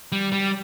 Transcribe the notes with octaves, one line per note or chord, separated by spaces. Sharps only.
G3
G3